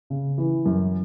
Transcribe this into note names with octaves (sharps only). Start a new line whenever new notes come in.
C#3
E3
F#2